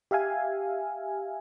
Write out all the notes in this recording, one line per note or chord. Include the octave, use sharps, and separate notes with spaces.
G4 E5 F5 G#5